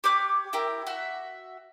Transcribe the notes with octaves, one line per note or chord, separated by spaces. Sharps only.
G4 C#5 D6 F#6
E4 G4 A#4
F#4 E5 F#5